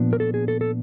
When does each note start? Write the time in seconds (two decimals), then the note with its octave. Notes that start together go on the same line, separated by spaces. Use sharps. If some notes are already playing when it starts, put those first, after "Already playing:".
Already playing: A#2 F3 B3 D4
0.13 A#4
0.20 A4
0.34 G#4
0.48 A4
0.61 A4